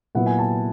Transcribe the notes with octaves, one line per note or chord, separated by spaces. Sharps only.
A#2 F#3 B3 E4 F#5
G#5
A5